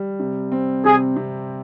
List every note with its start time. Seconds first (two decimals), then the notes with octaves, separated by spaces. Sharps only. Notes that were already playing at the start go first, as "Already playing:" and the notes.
Already playing: G3
0.19 C3
0.52 C4
0.84 C3 G#4
1.16 C3